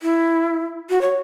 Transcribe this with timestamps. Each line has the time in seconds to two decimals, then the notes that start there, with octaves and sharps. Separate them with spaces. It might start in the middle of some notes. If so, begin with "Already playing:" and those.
0.02 E4
0.90 F#4
1.01 C#5